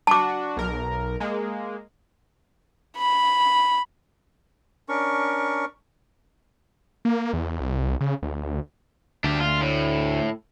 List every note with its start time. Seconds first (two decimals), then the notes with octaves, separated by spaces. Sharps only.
0.07 D4 F#4 A5 D6
0.57 B1 A#4
1.20 G#3 A#3
2.97 B5
4.89 C#4 D4 A#4 C#6
7.05 A#3
7.33 E2
7.60 C2
8.01 C#3
8.22 D2
9.24 D2 D4 G4
9.40 F4
9.62 A2